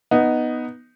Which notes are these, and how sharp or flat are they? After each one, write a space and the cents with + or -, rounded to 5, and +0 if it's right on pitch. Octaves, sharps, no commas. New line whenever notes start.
B3 +0 D#4 +0